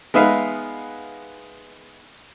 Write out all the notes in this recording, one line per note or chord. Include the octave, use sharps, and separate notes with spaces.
G#3 B3 D#4 B4 E5 F5